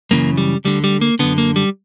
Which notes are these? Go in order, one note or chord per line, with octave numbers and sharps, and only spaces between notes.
F#2 C#3 E3 A#3
G3
D2 D3 G3
G3
A#3
F#2 D3 B3
A#3
G3